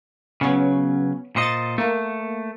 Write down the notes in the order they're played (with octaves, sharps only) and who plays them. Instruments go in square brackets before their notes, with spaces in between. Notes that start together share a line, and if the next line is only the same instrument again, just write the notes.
[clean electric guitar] C#3 F#3 [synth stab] B3 C#4
[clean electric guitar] A#2 C5 D#5 [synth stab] A6 C#7
[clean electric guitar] A3 [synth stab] A#3